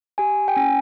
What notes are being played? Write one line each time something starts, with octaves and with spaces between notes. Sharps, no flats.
G4 G#5
G5
C#4 G#5